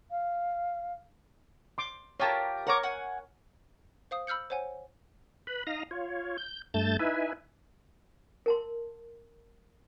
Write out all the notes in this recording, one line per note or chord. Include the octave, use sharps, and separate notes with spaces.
F5
C6 D6
F4 G4 A#4 C#5 A5
A#4 C#5 F#5 A#5 C#6 D6
F#5 G#5
C5 F5 D#6
B5 E6 F6 G6 C#7
C5 C#5 F#5 G#5
B4 B5
D#4 F5 A#5 D#6 A#6
F4 C#5
G6
G2 A3 A5 G6 A6
D#4 E4 B4 E5 G#5
A#4 A5 C6